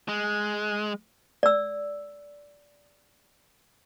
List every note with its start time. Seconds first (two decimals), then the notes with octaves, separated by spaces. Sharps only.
0.08 G#3
1.43 D5 E6